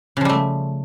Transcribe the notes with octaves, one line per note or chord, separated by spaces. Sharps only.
C#3 F3 G3 A3